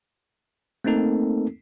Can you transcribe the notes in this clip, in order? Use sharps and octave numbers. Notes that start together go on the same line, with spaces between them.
A3 A#3 C4 D#4 A4 A#4